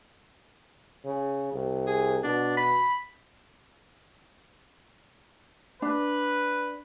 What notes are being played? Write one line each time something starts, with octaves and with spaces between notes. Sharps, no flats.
C#3
C2
G#4
B2 D4
B5
D4 B4